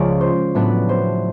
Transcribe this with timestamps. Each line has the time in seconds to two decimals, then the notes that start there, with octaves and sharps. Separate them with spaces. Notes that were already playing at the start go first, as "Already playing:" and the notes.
Already playing: C#2 C#3 F3 D5
0.21 C5
0.55 A2 F#3 B3 D4 B4
0.89 C5